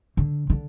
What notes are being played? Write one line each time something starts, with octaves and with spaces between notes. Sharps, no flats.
D3
D3